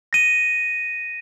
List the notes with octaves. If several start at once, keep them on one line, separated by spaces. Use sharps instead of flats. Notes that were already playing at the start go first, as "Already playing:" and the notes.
A#6 D#7